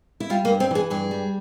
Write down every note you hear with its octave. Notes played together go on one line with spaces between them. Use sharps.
E4
G3 F4
A#3
G2
C4
E3 G#4
G2 G#4
G3